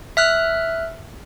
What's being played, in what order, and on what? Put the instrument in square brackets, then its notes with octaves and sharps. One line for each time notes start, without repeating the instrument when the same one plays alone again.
[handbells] E5 F6 F#6